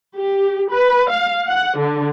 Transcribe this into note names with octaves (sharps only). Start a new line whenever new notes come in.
G4
B4
F5
F#5
D3